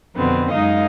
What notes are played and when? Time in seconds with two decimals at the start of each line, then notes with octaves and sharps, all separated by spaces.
0.15 F2 B2 D3 B3 C4
0.51 F#2 G#3 D#4 D#5 F5